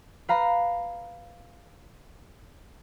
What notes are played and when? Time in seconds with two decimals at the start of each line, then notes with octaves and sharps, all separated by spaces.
0.29 B4 F5 A#5 B5